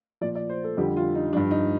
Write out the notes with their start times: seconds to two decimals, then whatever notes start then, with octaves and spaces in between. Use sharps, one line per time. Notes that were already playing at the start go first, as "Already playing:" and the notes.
0.21 A#2 F3 D5
0.35 D5
0.49 C5
0.64 A4
0.77 F2 D3 G3 G4
0.97 F4
1.15 D#4
1.33 G2 F3 D4
1.51 D#4